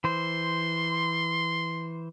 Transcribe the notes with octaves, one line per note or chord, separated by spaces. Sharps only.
E3 C5 C6